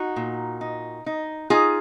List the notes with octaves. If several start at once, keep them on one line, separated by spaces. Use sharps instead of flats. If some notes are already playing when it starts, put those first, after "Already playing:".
Already playing: D#4 F#4
A#2
D#4
D#4
D#4 F4 G#4